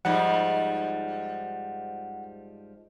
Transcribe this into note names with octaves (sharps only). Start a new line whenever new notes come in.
G#2 F3 G3 F#5